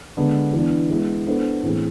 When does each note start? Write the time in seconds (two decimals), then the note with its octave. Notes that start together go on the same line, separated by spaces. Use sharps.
0.17 D3 G#3 B3 D4
0.53 E3 B3 D4
0.90 G#3 B3 E4
1.27 B3 D4 A4 C5
1.63 A2 E3 A3 C4 G#4